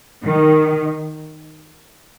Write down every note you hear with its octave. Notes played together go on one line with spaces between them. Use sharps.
D#3